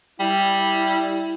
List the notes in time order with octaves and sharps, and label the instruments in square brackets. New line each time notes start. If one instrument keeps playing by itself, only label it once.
[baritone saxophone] G3 [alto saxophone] E4